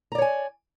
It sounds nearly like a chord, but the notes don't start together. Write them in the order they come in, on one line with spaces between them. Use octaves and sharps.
A#5 D5 C#5 G#5